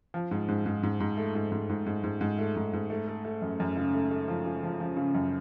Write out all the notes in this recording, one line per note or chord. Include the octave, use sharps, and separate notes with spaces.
F3
G#2
G#2
G#2
G#2
G#2
A3
G#2
G#2
G#2
G#2
G#2
G#2
A3
G#2
G#2
A3
A3
A3
F#2
F#2
C#3
A3
A3
F3
C#3
F3
F3
C#3
F#2